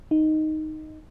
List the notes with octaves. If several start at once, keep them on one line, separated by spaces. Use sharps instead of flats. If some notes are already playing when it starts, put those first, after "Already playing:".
D#4